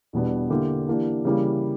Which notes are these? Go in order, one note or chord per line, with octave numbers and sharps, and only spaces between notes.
E2 B2 G3 B3 D4
D3 A#3 E4 G4
E3 A#3 D4 G4
C#3 E3 G3 A#3